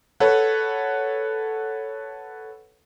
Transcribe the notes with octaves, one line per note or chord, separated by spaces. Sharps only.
A4 B4 C#5 F#5